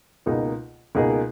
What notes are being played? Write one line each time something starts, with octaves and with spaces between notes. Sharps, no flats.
C#2 B2 A#3 D#4 G#4
C#2 B2 A#3 D#4 G#4